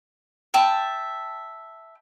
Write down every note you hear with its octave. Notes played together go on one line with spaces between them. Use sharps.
E5 G5 A5